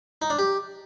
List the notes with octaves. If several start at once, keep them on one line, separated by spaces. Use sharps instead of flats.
D#4
D4
G4